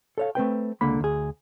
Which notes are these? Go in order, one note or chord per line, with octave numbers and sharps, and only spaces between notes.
A4 C#5 F5
A3 C4 B4 G5
C#2 D3 A#3 B5
D2 G#4